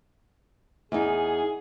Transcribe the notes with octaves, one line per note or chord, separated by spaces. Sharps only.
E2 D#4 G#4